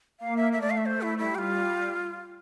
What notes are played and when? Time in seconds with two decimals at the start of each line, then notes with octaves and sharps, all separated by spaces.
0.20 A#3 F5
0.37 E5
0.52 A3 E5
0.61 D5
0.70 F5
0.77 E5
0.86 C5
1.02 E4
1.18 G3 E4
1.35 G4
1.38 F4